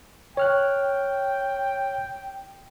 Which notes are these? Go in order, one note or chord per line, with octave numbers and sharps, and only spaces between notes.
C#5 G5 F6 F#6